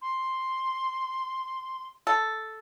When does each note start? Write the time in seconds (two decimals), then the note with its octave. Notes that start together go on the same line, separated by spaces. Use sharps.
0.02 C6
2.07 A4